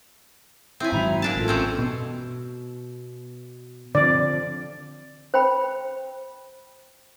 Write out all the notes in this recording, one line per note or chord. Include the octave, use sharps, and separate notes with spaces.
C4 C#4 E4 E5 G#5
G#2 D#3 F#3 E5 A#5 B5
A#2 D4 G#5 A5
A1 F4 A4
E3 C4 C#4
B2
D3 F3 C4 D5
C5 G5 B5